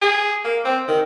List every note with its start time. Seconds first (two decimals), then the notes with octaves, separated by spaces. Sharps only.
0.01 G#4
0.44 A#3
0.65 C4
0.88 D#3